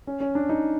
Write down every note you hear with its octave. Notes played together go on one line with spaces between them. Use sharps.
C#4
C#4
D4
D#4